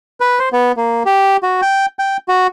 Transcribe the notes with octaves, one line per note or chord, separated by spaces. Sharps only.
B4
C5
B3
A#3
G4
F#4
G5
G5
F#4